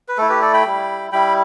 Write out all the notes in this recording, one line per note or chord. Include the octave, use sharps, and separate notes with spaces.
B4
A3 E4 A4
G4 B4
A4 D5
G5 B5
G3 E4
G3 E4 G5 B5